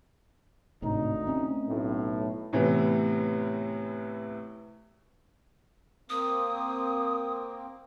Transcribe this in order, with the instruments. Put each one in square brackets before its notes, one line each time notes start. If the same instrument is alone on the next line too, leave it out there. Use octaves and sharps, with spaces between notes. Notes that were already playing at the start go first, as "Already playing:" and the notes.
[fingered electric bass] G#1 A2 C3 [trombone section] D2 D#4
[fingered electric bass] A3 C4 C#4
[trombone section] B1 A2
[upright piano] A2 C3 E3 B3 E4
[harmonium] A#3 C4 [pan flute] D#6